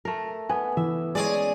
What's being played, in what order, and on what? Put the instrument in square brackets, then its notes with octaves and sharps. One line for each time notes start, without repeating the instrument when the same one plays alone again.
[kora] A3 A#4
[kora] B3 [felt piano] G#5
[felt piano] E3 [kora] E5
[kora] G#3 C#4 [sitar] G#4 D5